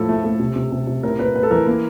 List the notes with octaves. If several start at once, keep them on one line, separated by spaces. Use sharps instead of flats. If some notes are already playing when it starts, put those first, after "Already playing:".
Already playing: A2 F3 A4
A3
A3
C3
C3
C3
C3
A2 A#4
A2 B4
A2 B4
A4
E3 A#4
A#3